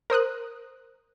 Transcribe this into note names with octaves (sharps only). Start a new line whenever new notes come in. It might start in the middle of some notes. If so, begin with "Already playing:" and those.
A#4 C5 D#6 F#6